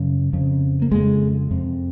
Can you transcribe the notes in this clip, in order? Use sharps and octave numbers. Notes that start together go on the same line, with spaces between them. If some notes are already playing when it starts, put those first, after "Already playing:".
Already playing: F#2 C#3
F2 C#3
A#3
F2 C#3 G#3
F2 C3